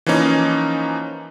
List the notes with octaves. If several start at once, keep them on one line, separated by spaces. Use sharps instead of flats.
E3 F3 A#3 C#4 D#4